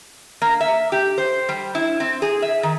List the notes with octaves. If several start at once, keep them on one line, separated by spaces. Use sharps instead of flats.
A#3
E5
G4
C5
G3
E4
C4
G#4
E5
D#3